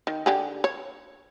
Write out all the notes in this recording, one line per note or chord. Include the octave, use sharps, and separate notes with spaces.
D#3
D3 G4 G#4
C#5